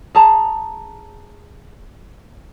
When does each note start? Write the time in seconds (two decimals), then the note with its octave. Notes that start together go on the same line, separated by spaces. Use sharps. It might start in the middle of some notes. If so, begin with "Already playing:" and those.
0.15 G#4 A5 A#5